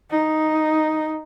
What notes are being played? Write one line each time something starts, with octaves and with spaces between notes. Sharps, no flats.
D#4